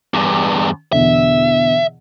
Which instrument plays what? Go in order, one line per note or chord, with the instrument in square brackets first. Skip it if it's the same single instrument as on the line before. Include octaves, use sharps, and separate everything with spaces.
[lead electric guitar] E2 G2
[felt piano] E2 B2 D3 [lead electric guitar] E5